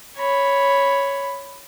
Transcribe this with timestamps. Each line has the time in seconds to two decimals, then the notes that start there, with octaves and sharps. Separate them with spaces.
0.17 C#5 B5